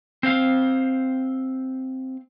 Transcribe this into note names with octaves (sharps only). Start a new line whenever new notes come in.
C4 C5 F5